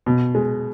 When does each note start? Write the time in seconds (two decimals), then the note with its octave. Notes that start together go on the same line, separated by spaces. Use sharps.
0.06 B2
0.35 G#3